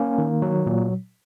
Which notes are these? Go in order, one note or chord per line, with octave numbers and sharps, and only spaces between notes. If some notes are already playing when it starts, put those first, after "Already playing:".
Already playing: A#3 C#4
D#3
F#3
A#2